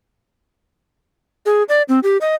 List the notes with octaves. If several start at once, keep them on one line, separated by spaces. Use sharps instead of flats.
G#4
D5
C4
G4
D#5